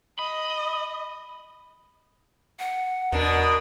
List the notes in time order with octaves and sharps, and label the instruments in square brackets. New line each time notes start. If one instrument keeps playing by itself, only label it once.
[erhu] D#5 [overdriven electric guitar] B5
[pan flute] F#5
[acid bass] E2 [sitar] B2 D4 [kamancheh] A#4 D#6